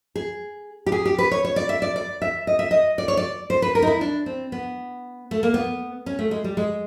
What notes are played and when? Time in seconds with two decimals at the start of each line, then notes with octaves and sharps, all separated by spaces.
0.15 G#4
0.86 G4
0.92 G#4
1.05 G4
1.19 B4
1.31 C#5
1.45 C#5
1.56 D5
1.69 E5
1.82 D5
1.96 D5
2.22 E5
2.47 D#5
2.59 E5
2.71 D#5
2.98 D5
3.08 C#5
3.17 D5
3.50 C5
3.62 B4
3.75 A#4
3.82 D#4
3.87 E4
4.01 D4
4.26 C4
4.52 B3
5.31 A3
5.43 A#3
5.54 B3
6.06 C#4
6.19 A3
6.31 G#3
6.44 G3
6.57 G#3